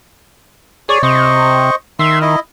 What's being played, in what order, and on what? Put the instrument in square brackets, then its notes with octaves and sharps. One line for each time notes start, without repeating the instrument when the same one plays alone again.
[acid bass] G#4 [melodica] C#5 D5
[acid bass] C3 [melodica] C5 D#5 C#6
[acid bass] D#3 [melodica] E5 C6
[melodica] E4 D#5